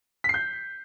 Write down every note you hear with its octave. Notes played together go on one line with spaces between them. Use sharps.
G6 B6 C7